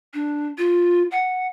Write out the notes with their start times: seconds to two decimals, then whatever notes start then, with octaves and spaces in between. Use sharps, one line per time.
0.14 D4
0.58 F4
1.12 F#5